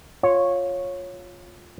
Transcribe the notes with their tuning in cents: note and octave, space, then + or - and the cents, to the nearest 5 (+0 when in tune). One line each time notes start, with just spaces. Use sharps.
F4 +15 C#5 -10